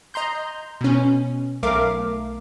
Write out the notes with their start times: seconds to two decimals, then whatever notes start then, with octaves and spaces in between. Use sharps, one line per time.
0.14 D#5 A#5 C6 G6
0.81 B2 C#4
1.63 B1 A3 A#4 F5 D6